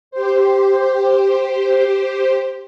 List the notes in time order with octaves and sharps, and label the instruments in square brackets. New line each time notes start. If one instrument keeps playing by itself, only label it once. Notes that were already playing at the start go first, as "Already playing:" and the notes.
[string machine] G4 C5